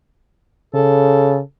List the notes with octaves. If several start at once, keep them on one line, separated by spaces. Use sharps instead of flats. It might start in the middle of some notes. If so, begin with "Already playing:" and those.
C#3 A4